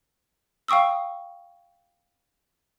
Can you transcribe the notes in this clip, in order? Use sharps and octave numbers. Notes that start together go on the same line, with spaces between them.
F5 G5 C#6 D#6 E6